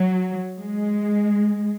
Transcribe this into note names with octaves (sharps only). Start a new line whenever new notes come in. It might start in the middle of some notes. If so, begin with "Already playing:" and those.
Already playing: F#3
G#3